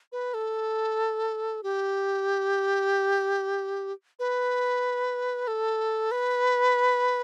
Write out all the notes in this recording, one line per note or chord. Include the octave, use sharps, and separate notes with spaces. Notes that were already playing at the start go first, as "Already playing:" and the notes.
B4
A4
G4
B4
A4
B4